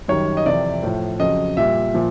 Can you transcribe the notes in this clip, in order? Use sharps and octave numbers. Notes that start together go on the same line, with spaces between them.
F#2 D#3 G3 C#5
D#5
F2 C3 E3 D5
A2 F3
F2 C#3 F#3 D#5
A#2 G3 E5
A#2 F3